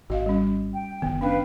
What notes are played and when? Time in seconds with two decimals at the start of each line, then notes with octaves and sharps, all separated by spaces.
0.10 G#1 F#4 D#5 F5
0.26 G3 C#4
0.74 G5
1.02 F#1 D#3 B3
1.21 C#4 D4 B4 F5 G5